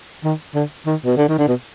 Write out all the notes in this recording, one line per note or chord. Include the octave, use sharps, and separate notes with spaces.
D#3
D3
D#3
B2
D3
D#3
D3
B2